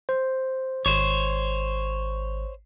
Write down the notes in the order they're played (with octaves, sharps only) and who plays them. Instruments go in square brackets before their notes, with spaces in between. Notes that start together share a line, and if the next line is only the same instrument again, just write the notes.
[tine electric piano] C5
[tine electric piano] G#1 [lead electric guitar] C5 C#5